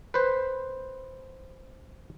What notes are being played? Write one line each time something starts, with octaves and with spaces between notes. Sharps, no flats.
B4 C5